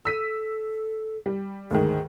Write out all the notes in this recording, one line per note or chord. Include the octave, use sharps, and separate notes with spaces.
A4 E6 B6 D#7
G3
D2 G#2 D#3 G#4